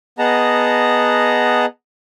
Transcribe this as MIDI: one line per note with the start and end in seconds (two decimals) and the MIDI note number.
0.19 1.66 59
0.19 1.66 68
0.19 1.66 75
0.19 1.66 78
0.19 1.66 81
0.19 1.66 82